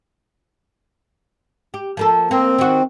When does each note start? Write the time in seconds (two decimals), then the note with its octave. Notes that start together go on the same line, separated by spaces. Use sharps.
1.74 G4
1.97 F3 A#3 A4
2.31 A#3 C4
2.58 D#3 F#4